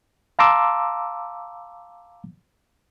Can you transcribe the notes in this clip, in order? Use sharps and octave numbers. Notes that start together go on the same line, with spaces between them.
F5 A5 A#5 C6 D6 E6